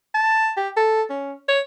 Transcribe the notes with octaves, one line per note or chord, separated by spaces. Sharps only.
A5
G4
A4
C#4
C#5